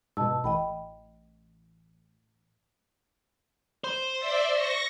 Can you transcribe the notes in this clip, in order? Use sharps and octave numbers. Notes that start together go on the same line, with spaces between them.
G#2 B2 D#5 A5 E6
A1 D#5 G5 B5
C5
D5 E5
C#6 A#6